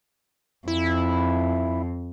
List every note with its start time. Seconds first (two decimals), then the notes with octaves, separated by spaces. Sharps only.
0.68 F2 E4